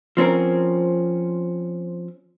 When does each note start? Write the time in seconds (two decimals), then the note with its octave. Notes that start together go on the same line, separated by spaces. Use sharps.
0.17 F3 C4 C#4 A#4